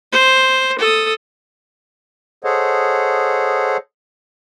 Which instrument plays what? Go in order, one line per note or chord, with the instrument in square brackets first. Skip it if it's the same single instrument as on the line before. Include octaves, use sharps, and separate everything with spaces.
[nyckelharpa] C5
A4 D#6
[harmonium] G#4 A4 C5 C#5 D#5 F#5